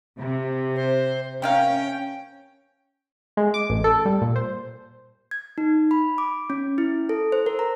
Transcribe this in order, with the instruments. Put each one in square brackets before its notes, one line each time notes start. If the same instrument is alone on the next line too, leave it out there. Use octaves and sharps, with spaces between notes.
[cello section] C3
[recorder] C5
[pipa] C3 A#3 F5 [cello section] C#4 [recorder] G5
[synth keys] G#3
D6
A1
A4
G3
A#2
C5
[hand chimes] G#6
D#4
B5
D6
C#4
E4
A4
C5
A#4
A#5